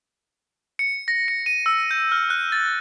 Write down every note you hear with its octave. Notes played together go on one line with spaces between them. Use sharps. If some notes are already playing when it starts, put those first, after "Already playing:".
C#7
A#6
C#7
D#7
E6
G6
F6
F#6
A6